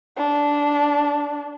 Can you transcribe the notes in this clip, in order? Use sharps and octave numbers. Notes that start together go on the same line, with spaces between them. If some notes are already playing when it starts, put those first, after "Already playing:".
D4